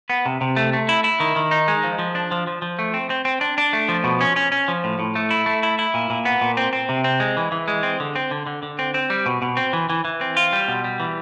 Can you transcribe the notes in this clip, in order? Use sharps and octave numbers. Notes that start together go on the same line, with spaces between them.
B3
C3
C3
A3
A3
E4
E4
D#3
D#3
D#4
G#3
F3
F3
D4
F3
F3
F3
A3
C4
C4
C4
D4
D4
A3
F3
B2
C#4
C#4
C#4
F3
A2
A2
A3
E4
A3
E4
E4
A#2
A#2
B3
A#2
C4
C4
C3
C4
G#3
E3
E3
G#3
C4
D3
C4
D3
D3
D3
C4
C4
G3
B2
B2
C4
E3
E3
E3
C4
F4
G3
B2
G3
E3